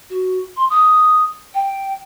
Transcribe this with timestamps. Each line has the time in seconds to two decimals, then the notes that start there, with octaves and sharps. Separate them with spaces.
0.10 F#4
0.56 C6
0.70 D#6
1.54 G5